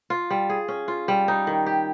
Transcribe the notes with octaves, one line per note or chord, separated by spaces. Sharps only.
F4
G3
G#4
C#4
F4
G3
D#4
D#3
G4